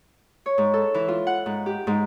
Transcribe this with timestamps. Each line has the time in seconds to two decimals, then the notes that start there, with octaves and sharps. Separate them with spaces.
0.46 C#5
0.58 G#2
0.74 A4
0.94 E3
1.08 F4
1.27 F#5
1.46 G#2
1.66 G4
1.87 G#2